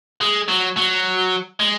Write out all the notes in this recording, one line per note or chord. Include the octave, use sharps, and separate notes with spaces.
G#3
F#3
F#3
G#3